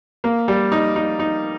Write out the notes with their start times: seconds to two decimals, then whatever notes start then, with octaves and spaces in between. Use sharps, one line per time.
0.24 A#3
0.48 G3
0.72 D#4
0.96 D#4
1.19 D#4